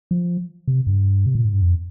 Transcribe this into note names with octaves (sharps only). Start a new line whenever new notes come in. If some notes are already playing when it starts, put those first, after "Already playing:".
F3
C3
G2
C3
A#2
G#2
G2
F2